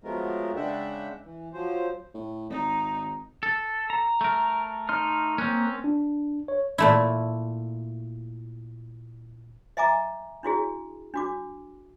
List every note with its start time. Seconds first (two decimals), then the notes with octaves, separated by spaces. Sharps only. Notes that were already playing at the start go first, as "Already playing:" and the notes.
0.04 F3 F#3 G#3 A3 B3 A#4
0.56 C#3 G#3 D4 E5 F#5 G5
1.24 E3
1.53 F3 F#3 C5
2.14 A2
2.50 G#1 D#4
3.43 A4
3.90 A#5
4.21 A3 A#4
4.89 D#4 C6 F6
5.38 A#3 C4 C#4 F#6
5.84 D4
6.48 C#5
6.78 A#2 A3 E4
9.77 D#5 E5 G#5 A#5 D6
10.43 D4 E4 F#4 G#4
11.14 D4 F#4 D6